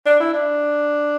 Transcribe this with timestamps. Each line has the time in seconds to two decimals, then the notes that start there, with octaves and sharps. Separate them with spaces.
0.06 D4
0.20 E4
0.33 D4